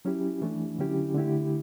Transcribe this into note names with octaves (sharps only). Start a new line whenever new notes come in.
F#3 C#4 E4 G4
E3 A3 D4
D3 F#3 C#4 E4 G4
D3 A3 E4 G4